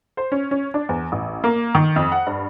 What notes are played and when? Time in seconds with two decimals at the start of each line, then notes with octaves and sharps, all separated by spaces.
0.17 C5
0.32 C#4
0.51 C#4
0.74 D4
0.89 E2
1.12 A1
1.44 A#3
1.75 D#3
1.96 F2
2.12 F#5
2.27 G2